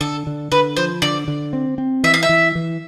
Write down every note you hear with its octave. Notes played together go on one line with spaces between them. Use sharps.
D3 A4
D3
D3 B4
F3 C5
D3 D5
D3
C4
C4
E3 E5
F5
E5
E3
E3